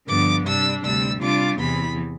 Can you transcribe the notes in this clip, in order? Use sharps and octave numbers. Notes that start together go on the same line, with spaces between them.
G2 D3 F3 B3 D6
C3 G3 D4 E6
D2 C3 G3 E6
C3 G3 D4 F4 D6
E2 C3 E3 B3 B5